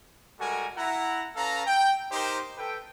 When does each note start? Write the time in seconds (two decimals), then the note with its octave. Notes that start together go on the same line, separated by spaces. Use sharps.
0.39 G3 G#3 F#4 A4 A#4 G#5
0.77 E4 F#5 A#5
1.36 C#4 A4 B4 F5 A#5
1.66 G5
2.12 D#4 G4 A#4 C5
2.58 A4 B4 G5